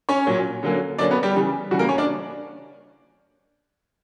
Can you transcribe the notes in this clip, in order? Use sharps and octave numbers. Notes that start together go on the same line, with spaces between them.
C#4 C#5
A#2 F#3 C#4
D3 F#3 A#3 C#4
D3 F#3 A#3 C#4 D4 D5
B3 B4
G3 G4
C#3 E3 G3
C#3 E3 G3 F#4
A#3 A#4
C#4 C#5
D4 D5